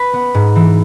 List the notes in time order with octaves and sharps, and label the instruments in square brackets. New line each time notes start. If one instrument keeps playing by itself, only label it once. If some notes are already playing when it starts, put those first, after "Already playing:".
Already playing: [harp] B4
B3
G#2
E3